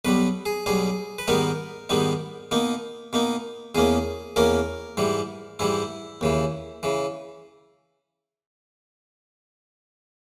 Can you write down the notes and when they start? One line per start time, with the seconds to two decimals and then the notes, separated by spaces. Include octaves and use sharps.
0.05 B1 B2 G3 B4
0.46 G#4
0.66 B1 B2 G3 G#4
1.19 B4
1.28 G#2 D#3 G3 B3 D#4 A#4
1.89 G#2 D#3 G3 B3 D#4
2.51 B2 A#3 D#4
3.13 B2 A#3 D#4
3.75 E2 B2 A#3 C#4 G#4
4.36 E2 B2 A#3 C#4 A#4
4.97 G#2 E3 G3
5.59 G#2 E3 G3 E4
6.21 D#2 C#3 E3
6.83 C#3 E3